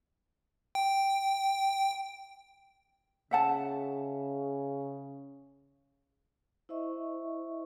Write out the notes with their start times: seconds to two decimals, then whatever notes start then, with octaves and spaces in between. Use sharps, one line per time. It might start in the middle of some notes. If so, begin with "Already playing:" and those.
0.75 G5
3.31 C#3 E5 F#5 A5
6.69 E4 C5 D#5 E5 C#6